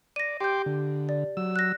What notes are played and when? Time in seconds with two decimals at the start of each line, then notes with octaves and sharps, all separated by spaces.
0.16 D5 A#6 D#7
0.40 G4 G5 C6 D6 G6
0.66 D3
1.09 D5
1.37 F#3 E6
1.56 F#6 A#6